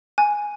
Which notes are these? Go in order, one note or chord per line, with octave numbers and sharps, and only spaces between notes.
G#5